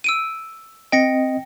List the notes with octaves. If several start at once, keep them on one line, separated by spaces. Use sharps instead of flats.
E6 D7 D#7
C4 D#5 G5 A#6 C#7